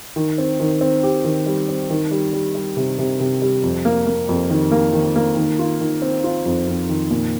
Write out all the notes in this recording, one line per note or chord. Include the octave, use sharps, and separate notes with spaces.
D#3
C4
D#3
C4
G4
D#3
G3
C4
D#3
G3
G3
G3
C3
C3
C3
G3
F2
A#3
A#3
F2
D#3
A#3
D#3
A#3
D#3
F4
D#3
C4
F4
F2
F2
D#3
A#2